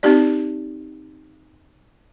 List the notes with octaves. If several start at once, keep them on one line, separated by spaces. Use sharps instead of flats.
C4 D#4 G4 D5